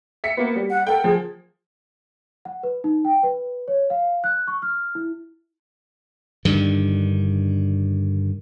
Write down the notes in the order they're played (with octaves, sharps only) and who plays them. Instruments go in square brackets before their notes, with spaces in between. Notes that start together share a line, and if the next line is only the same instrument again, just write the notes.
[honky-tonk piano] E5 B6 C#7
A#3 B3
G3
[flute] F#5
[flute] A4 [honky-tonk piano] A#4 F#5 G5
[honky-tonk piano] F3 [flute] G#4
[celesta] F#5
B4
D#4
G5
B4
C#5
F5
F#6
C#6
F6
E4
[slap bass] G2 D3 D#3